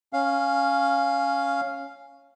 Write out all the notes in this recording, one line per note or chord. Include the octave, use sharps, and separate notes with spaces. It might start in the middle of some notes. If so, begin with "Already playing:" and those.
C#4 F5